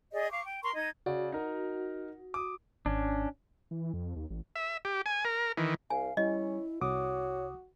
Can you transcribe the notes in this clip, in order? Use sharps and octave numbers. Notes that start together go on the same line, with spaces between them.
G#4 D5 D#5
F5 C#6 D6
G5
A#4 A#5 C6 C#6
D#4 D#5 G#6
C#3 F#4 D5
D#4 A#4
D6 D#6
G#1 C#4 D4
E3
F2
D#2
A1
E5
G4
G#5
A#4
D#3 E3
C2 F5 G#5
G3 C#4 E4 D#5
C2 F#4 C#5 D6 D#6